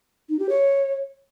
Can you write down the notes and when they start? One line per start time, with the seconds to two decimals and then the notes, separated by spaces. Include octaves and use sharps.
0.29 D#4
0.39 G4
0.49 C#5